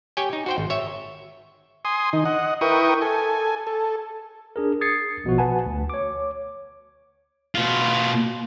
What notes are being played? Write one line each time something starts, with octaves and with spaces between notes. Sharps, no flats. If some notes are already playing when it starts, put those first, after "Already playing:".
G4 C#5 G5 G#5
D#4
F#4 C5 G5
G#1
C#5 E5
G#5 C6 D#6
D#3 D#4
D#5 F#5
E4 A#4 B4 G5 C#6 D#6
A4 G#5
A4
D4 G#4 A#4
D#6 G#6 A6 C7 C#7
A#1 B2 F3 F#4
B4 F#5 G#5 A5
D2
C#5 D6
B2 F4